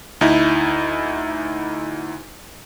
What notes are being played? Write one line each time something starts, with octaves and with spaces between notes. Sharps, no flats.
D2 D#4 E4